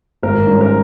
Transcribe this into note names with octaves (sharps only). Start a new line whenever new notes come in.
G#1 A#4
G#2 G3 C#4
A#4